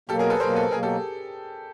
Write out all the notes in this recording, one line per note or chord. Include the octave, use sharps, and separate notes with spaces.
B2 F#3 A#3 G4 A4
G#4 A#4
A4 B4
B2 F#3 A#3 A#4 C5
A4 B4
B2 F#3 A#3 G#4 A#4
G4 A4